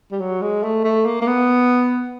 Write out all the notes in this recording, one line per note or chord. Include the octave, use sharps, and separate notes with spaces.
G3
F#3
G#3
A3
A3
A#3
A#3
B3